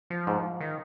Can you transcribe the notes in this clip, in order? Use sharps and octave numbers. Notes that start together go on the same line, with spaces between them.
F3
G#2
D#3